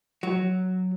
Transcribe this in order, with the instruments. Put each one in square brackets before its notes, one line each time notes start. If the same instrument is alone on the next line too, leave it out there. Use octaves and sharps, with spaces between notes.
[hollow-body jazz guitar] F#3